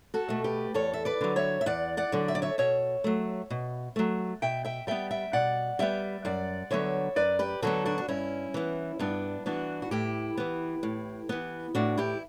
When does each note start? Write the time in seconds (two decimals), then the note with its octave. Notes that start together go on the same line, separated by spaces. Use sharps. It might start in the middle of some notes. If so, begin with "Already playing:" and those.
0.14 F#4 A4
0.29 B2 A3
0.44 G4 B4
0.74 E2 A4 C#5
0.94 E5
1.05 B4 D5
1.21 D3 F#3
1.36 C#5 E5
1.61 E5
1.66 E2 D5 F#5
1.97 D5 F#5
2.12 D3 F#3
2.28 E5
2.35 D5
2.42 C#5 E5
2.58 B2 C#5 E5
3.04 F#3 A3
3.50 B2
3.96 F#3 A3
4.42 B2 E5 G5
4.65 E5 G5
4.87 G3 B3 E5 G5
5.11 E5 G5
5.33 B2 D5 F#5
5.79 G3 B3 E5 G5
6.25 F#2 D5 F#5
6.71 D3 F#3 B3 C#5 E5
7.16 F#2 B4 D5
7.39 G4 B4
7.62 D3 F#3 B3 F#4 A4
7.85 D4 F#4
7.98 D4
8.08 G2 C#4 E4
8.54 E3 B3
8.99 G2 B3 D4
9.46 E3 B3 D4 F#4
9.82 F#4
9.91 A2 E4 G4
10.37 E3 B3
10.83 A2
11.29 E3 B3
11.75 A2 D4 F#4
11.98 E4 G4